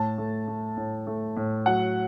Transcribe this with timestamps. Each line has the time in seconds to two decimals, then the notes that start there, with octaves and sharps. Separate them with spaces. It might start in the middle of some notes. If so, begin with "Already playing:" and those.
Already playing: A2 A5
0.18 A3
0.48 A3
0.77 A2
1.07 A3
1.36 A2
1.66 F#3 F#5